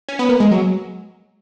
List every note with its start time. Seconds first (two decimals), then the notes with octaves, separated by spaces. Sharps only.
0.08 C#4
0.19 B3
0.29 A#3
0.40 G#3
0.51 F#3